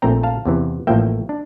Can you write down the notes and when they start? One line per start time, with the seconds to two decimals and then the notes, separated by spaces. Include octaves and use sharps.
0.02 A#1 A#2 A3 C4 G5 A#5
0.23 F5 A5
0.45 E2 C3 E3
0.87 A1 A2 F3 A#3 E5 G5
1.29 D4